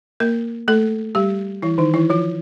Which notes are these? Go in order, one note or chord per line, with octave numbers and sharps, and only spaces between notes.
A#3 A#4
A3 A4
G3 G4
E3 E4
D#3 D#4
E3 E4
F3 F4